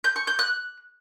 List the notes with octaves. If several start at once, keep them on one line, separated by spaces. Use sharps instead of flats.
G6
C#6
G6
F#6